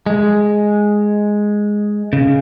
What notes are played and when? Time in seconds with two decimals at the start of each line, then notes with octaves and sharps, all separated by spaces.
0.06 G#3
2.13 C#3